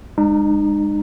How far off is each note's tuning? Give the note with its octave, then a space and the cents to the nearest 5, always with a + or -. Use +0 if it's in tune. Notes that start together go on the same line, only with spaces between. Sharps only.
G#3 -20 D#4 -45 A#5 +0